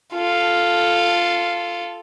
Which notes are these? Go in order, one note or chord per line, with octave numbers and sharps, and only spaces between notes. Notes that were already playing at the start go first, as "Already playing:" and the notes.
F4 A4